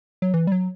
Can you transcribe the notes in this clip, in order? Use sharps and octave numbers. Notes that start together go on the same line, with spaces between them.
F#3
E3
G3
F#3